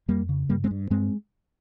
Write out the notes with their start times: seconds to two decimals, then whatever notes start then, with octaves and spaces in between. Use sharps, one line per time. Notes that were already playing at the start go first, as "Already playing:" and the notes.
0.08 F2 G3 A#3
0.29 C#3
0.49 G2 G3 A#3
0.64 G#3 C4
0.71 G2
0.90 G2 G#3 C4